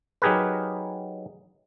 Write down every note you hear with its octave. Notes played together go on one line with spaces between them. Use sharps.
F#3 D#4 G4 G#4 A#4 B4